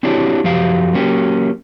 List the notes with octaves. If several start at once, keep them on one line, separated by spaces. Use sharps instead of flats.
C4 D4 E4 F#4 G4 C#5
F#2 F3 F#3 G4 F5
F#3 A#3 C#4 G4